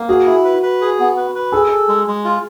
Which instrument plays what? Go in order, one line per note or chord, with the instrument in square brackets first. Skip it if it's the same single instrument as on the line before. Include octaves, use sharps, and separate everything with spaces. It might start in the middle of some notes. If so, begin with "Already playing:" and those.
Already playing: [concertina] A#3
[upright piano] F#4 [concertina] G#4
[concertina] E4
B4
B4
G#4
B3
B4
B4
[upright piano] G#4 [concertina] A4
[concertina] A4
G#3
G#3
F4